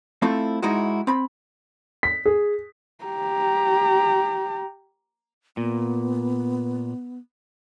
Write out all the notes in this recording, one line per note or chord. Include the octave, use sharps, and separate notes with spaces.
A3 C4 E4 F4 A4
G#2 G#3 D#4 E4 F#4
C4 B5
B6
G#4
G4 A#5
A#2 B3